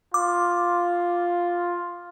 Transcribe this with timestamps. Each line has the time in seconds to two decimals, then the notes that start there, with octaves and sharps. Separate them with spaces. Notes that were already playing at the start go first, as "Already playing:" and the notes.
0.14 F4 D6